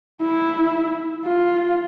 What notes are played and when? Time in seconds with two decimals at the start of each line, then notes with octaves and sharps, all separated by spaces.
0.22 E4
1.25 F4